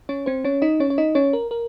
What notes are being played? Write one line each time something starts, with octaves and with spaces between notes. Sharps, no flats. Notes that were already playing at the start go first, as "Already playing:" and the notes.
C#4 C#5
C4 C5
C#4 C#5
D#4 D#5
C#4 C#5
C#5
D#4 D#5
C#4 C#5
A#4
A#4